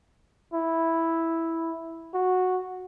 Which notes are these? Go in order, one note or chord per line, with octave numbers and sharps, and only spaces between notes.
E4
F#4